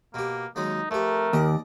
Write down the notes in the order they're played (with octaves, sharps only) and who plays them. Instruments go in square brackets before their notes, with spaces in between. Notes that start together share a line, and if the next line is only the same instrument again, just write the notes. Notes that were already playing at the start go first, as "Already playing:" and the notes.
[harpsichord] B2 G4 [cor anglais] A#3
[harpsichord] D#2 F#3 G#3 [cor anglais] D#4
[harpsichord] F2 G4 [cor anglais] A3 [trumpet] A#4
[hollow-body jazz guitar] D#2 [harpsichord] D5 D#5